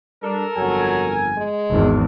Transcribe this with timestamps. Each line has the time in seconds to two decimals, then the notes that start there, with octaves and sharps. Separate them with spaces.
0.23 G3 D4 A4 A#4
0.57 G1 F2 F#3 G#5
1.37 G#3
1.69 G#1 E2